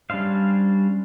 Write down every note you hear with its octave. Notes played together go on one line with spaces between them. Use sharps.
G3 C#4 D4 C5 F5